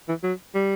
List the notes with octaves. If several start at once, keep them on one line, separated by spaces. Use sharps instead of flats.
E3
F#3
G3